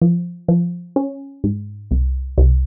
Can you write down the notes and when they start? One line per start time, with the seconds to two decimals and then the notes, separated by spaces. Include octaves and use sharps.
0.02 F3
0.48 F3
0.96 C#4
1.44 G#2
1.91 C2
2.38 C2